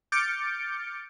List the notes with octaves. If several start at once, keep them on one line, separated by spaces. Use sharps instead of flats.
D6 F6 G6 A6 C#7 D7